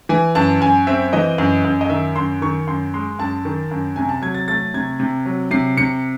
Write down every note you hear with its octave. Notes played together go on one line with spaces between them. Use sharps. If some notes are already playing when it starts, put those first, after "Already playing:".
E3 G#5
F#2 A5
F#2 G#5
C4 E5
E3 D#5
F#2
F#2
D#5
D#3 E5
F#2 C6
D#3 C#6
F#2 C6
G#3 C6
F#2 A5
D#3
F#2
C3 G#5
A5
F#3 G#6
A6
A3 A6
C3 G#6
C3
F#3
C3 C7
C3 C#7